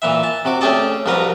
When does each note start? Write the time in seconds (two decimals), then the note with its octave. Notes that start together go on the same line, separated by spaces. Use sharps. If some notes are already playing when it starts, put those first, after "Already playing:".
0.02 A#2 E3 E5
0.23 A5
0.45 C3 F#4 D6
0.61 A3 C#4 G4 G#4 D5 A5
1.06 C2 F2 F#4 A#4 B4 A#5